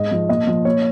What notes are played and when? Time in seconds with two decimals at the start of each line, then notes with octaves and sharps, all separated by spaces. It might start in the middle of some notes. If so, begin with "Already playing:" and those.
Already playing: G#2 D#5
0.11 F3
0.29 A#2 D#5
0.47 F3
0.65 A#2 C#5